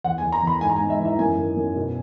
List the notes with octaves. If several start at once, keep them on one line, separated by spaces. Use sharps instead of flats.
E2 F#5
G#5
E2
A#5
E2 B5
G#2 G#5
A#5
G#5
G#2
E5
E3
E5
F#2 G#5
D#3
F#2
B2